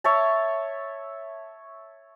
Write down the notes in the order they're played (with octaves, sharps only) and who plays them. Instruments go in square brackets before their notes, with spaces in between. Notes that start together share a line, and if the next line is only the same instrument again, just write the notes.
[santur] C#5 E5 A5